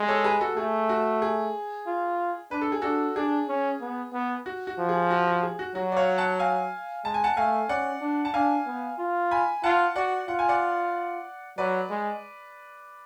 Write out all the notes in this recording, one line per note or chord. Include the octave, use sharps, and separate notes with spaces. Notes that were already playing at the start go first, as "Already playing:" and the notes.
Already playing: G#3
A4 C#5
G#4 B4
F#4 A4
A3 G#4
F#4
G#4
F4
D4 B4
A4
G#4
D4 F#4 A4
D4 G#4
C#4
B3
B3
F#4
F#4
F3
G#4
F#4
F#4
G#4
F#4
F#3 F#4
D5
C#5 F5
F#5 A5
F5 G#5
G#3 A5
G#5
F#5 A5
A3 F5 G#5
C#4 D5 F#5
D4
A5
D4 F5 G#5
B3
F4
G#5 B5
F4 F#5 A5
F#4 D5 F#5
F4 F#5
G#5
D5 F#5
F#3 B4 D5
G#3